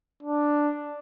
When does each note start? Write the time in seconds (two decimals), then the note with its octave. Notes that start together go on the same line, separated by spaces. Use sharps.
0.23 D4